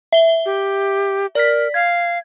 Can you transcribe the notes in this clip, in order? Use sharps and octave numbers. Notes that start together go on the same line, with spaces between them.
E5 G7
G4
A#4 D5 B6
F5 G#6